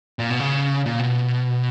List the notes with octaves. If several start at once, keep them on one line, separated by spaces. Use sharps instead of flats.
A#2
B2
C#3
A#2
B2